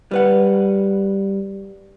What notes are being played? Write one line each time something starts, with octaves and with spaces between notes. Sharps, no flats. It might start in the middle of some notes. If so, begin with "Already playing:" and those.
G3 B4 F#5